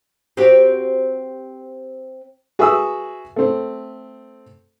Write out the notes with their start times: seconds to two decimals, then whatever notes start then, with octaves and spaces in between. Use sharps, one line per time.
0.37 C4 F#4 G4
2.59 F#4 G#4 B4 E5 D#6 E6
3.36 A3 C4